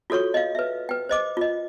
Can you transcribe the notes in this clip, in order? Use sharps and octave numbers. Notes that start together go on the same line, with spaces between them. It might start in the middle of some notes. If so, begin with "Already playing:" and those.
F4 F#4 A4 C#5 C#6
D#5 F5
B4 E5
B4 G5
C5 D#5 D6
F4 D#5